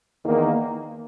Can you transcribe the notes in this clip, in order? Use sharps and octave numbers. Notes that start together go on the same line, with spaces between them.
E2 D#3 A#3